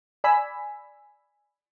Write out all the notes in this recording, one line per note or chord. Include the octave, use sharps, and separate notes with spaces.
D5 G#5 B5 E6 B6